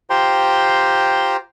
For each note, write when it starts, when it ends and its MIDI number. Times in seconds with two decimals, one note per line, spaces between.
0.10 1.37 65
0.10 1.37 67
0.10 1.37 72
0.10 1.37 79
0.10 1.37 82
0.10 1.37 84